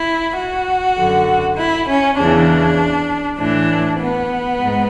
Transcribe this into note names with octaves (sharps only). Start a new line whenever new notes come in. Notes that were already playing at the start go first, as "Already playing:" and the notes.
Already playing: E4
F#4
F#2 D3
E4
C#4
E2 C#3 E3 D4
A2 E3 D4
B3
G#2